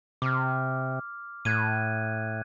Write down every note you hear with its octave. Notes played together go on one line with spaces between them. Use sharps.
C3 D6 F6
A2 F#6 G#6 D#7